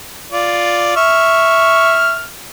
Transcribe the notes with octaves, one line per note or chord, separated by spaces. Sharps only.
F4 D5
E5 C#6 F6